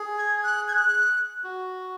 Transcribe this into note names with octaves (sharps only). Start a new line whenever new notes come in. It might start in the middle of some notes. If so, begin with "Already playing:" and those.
Already playing: G#4
G#6
F#6
G#6
F#6
F#4